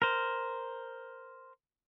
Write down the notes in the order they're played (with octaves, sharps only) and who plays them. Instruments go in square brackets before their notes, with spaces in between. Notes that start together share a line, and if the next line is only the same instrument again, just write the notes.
[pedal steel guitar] A#4 C5